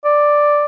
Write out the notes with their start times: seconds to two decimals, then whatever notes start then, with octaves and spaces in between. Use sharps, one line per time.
0.05 D5